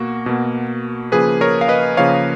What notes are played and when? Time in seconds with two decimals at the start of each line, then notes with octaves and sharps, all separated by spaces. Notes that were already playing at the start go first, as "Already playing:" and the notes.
Already playing: B2 A#3 F#4
0.26 B2 A#3
1.12 C#3 F3 A#3 G#4 B4
1.41 A#4 C#5
1.61 F5
1.68 B4 D#5
1.97 C#3 F3 A#3 C#5 F5